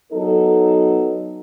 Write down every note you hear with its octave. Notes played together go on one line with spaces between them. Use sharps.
F#3 B3 D#4 A4